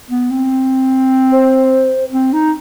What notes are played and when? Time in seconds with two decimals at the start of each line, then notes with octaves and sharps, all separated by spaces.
0.10 B3
0.30 C4
1.32 C5
2.12 C4
2.33 D#4